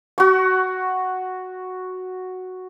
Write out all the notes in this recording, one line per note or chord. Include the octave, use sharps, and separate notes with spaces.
F#4 C#6